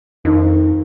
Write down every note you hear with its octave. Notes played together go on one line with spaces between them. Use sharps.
F2 D#3 D4 D#4